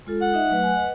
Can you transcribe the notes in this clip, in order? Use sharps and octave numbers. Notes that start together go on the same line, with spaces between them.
G#3 F4 A4
F#5
D#4 D#5 E5
F#3 A3 B4
G#5
B4 D#5